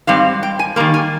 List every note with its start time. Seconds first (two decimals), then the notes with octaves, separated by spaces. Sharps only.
0.07 G#2 G3 C4 F5
0.43 G5
0.59 G#5
0.76 D#3 G3 A#3 A#5
0.94 G#5